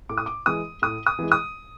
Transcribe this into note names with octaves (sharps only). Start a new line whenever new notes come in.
A2 D6
D#6
D6
E3 G#3 D#6
A2 D#6
D#6
E3 G#3
D#6